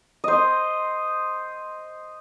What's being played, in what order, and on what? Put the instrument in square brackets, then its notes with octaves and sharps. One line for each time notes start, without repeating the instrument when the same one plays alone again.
[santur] C5 D#5